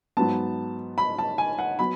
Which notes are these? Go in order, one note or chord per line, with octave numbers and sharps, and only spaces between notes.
G#2 F#3 B3 A5
B5
A5
G#5
F#5
F#3 B3 B5